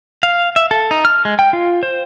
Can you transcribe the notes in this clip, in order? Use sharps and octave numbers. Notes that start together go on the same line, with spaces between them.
F5
E5
A4
D#4
F6
G#3
G5
F4
C5